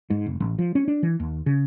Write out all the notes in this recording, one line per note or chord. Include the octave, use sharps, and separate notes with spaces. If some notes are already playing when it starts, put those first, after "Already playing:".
G#2
F1
A1
F3
C#4
D4
E3
D#2
C#3